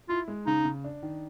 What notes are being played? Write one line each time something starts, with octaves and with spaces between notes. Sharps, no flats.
E4 F4
G#3
C#3 D#4
C#3
D4
D#3